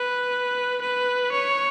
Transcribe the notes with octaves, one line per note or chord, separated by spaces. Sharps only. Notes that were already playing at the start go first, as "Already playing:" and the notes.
Already playing: B4
B4
C#5